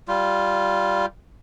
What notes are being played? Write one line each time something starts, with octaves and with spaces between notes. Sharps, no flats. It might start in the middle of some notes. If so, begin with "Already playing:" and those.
G3 F4